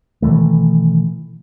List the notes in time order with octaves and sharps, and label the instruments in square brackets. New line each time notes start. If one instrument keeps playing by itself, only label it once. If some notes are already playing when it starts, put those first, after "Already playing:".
[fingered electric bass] B2 D#3 E3 A3